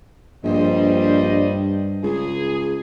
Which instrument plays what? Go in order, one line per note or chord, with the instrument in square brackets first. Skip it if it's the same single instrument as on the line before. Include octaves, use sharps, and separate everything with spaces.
[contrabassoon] A#1 [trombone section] G2 [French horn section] G3 C5 D#5
[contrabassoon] C#2 [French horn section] G#4